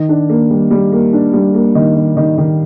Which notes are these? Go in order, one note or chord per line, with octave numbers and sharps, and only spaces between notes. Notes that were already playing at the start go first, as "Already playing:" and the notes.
Already playing: D#3
D4
A#3
G3
G3
A#3
D4
G3
A#3
D#3
D#3
D#3
D#3